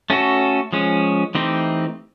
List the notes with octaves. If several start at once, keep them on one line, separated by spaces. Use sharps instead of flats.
A3 C#4 F#4 A4
F3 G#3 C#4
E3 A3 C4 D#4 G4